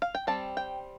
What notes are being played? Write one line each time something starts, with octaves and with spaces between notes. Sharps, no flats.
F5
G5
G3 C4 A5
G5